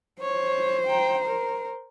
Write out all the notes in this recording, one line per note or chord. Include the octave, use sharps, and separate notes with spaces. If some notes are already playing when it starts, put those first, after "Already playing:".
C5 C#5
G5 A#5
A#4